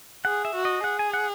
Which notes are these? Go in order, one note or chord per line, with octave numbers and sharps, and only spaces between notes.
G#4 F#5
E5
F#4
D#5
G#4 F#5
G#5
F#5